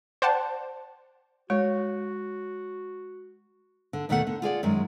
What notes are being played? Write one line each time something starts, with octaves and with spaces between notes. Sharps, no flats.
C5 D5 F#5 G5 A5
G#3 F#4 C#5
D3
D#2 B2 D#3 A3 F4 F#5
D3
F4 G#4 D5 F#5
F#2 D#3 G#3